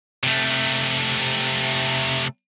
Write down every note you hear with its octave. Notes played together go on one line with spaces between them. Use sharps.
C3 A3